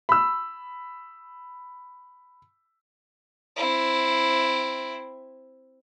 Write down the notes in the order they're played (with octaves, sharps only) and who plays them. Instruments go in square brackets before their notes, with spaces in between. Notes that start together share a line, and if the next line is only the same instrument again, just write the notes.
[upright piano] B5 E6
[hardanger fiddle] C4 E4